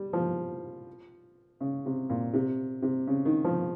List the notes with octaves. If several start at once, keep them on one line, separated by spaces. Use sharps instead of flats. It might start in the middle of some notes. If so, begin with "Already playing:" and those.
Already playing: G3
F3
C#3
C3
A#2
C3
C3
C#3
D#3
F3